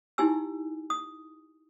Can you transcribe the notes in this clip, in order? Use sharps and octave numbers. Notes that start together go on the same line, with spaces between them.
D#4 E4 G4 G#5 E6
D#6